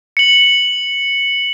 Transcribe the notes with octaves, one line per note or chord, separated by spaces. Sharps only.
C#7 F#7